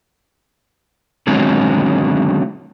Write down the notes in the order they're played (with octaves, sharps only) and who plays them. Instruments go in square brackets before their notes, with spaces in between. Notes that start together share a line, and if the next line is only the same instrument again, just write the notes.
[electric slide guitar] D3 D#3 F#3 G#3 C4 C#4